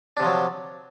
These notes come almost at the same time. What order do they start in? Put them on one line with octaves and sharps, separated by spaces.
D4 C3 F3 F#3